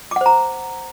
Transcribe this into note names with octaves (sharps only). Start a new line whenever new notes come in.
C5 F#5 A#5 D6